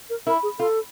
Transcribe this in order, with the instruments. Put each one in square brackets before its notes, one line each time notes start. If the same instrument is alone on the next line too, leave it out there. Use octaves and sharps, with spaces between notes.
[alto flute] A#4
[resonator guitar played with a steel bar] E4 [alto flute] A#4
[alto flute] G#4
[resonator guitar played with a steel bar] F4 [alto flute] A4